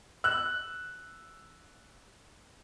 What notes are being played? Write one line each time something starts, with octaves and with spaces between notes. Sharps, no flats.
E6 F#6